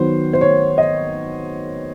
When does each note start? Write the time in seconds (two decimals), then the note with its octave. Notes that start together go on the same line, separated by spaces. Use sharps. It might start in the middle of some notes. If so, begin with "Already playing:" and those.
Already playing: D#3 F#3 B3 C5
0.33 C5
0.41 C#5
0.78 D#5